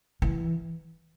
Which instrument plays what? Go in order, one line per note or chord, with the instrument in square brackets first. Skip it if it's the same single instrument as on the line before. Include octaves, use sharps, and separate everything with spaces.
[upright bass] E3